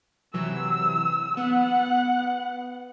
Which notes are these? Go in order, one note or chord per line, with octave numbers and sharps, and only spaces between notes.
C3 E3 F#3 E6
B3 F#5